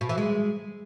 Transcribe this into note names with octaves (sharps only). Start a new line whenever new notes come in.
B2
E3
G#3